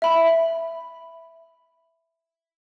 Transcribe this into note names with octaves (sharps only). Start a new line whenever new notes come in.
E5 B5